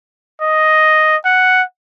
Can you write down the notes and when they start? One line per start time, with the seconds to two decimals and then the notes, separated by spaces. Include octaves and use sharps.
0.41 D#5
1.25 F#5